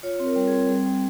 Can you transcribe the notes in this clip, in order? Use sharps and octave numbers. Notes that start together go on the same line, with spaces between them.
F4 C#5
C4
A#4
G3
G#4
C4
G3 G#4
G3